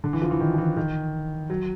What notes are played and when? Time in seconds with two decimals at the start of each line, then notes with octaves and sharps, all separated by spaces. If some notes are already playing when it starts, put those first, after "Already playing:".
0.04 D3
0.13 E3
0.22 F3
0.31 E3
0.40 D#3
0.54 F3
0.58 E3
0.77 D#3
1.50 F#3